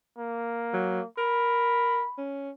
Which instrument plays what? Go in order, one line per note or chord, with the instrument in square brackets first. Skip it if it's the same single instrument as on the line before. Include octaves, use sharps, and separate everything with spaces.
[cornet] A#3
[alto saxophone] F#3
[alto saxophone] A#4 [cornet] B5
[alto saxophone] C#4